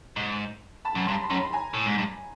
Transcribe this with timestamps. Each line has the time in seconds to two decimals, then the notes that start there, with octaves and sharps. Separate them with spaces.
0.16 G#2
0.85 A5 B5
0.95 F#2
1.07 G2 A#5 C6
1.23 B5
1.30 F#2 A#5 C6
1.43 B5
1.53 G#5 A#5
1.74 A2
1.86 G#2
1.98 G2